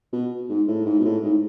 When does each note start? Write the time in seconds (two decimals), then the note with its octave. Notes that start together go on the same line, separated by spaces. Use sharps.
0.12 B2
0.49 G#2
0.67 A2
0.86 G#2
1.00 B2
1.04 A2
1.23 G#2